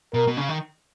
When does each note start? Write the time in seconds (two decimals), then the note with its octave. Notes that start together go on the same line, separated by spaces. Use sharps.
0.14 B2 A#4
0.28 B2
0.37 C#3
0.49 D#3